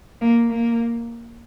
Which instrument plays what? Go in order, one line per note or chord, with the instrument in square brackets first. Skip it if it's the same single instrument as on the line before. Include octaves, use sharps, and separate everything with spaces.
[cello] A#3
A#3